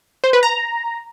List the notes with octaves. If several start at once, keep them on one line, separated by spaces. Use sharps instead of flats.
C5
B4
A#5